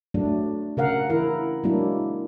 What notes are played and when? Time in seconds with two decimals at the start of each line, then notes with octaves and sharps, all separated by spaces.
0.14 F#3 A3 D4
0.77 C#3 A#4 F5 F#5
1.10 E3 E4 A#4
1.64 F#3 G#3 A#3 D4 E4